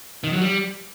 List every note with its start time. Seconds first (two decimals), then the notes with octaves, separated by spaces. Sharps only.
0.24 D#3
0.33 F#3
0.41 G3